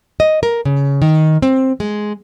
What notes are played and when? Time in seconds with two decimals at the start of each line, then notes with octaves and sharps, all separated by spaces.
0.20 D#5
0.43 A#4
0.65 C#3
1.02 D#3
1.42 C4
1.80 G#3